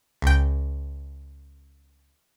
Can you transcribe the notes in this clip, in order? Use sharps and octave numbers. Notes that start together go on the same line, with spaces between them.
C#2 G5